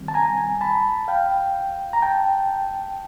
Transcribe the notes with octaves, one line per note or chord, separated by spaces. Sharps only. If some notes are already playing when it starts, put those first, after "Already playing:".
Already playing: C3 D#3 G3 C4
A5
G#5 A#5
A5 B5
F5 G5
A#5
G5 A5